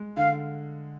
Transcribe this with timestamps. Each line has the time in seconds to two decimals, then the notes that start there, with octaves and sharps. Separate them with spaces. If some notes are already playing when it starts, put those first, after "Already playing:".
Already playing: G#3
0.17 D3 F5